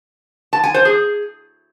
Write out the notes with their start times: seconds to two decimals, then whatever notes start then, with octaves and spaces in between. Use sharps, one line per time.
0.53 A5
0.64 G#5
0.74 C5
0.85 G#4